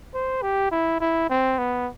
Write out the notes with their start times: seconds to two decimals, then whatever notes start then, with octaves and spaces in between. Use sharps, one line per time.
0.14 C5
0.42 G4
0.71 E4
1.00 E4
1.29 C4
1.58 B3